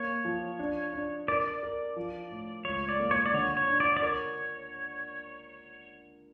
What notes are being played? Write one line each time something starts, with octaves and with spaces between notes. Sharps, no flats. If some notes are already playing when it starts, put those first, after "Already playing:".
Already playing: A#3 C#5
F3
D4
D4
A#4 D5
D5
A#4
F3
A2
C#2 C#5
D5
A#3
C#5
D5
D3 C#5
C#5
D4
D5
D5
A#4 C#5